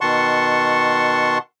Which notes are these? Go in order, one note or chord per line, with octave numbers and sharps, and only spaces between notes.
B2 D#3 F#5 A5 C6 C#6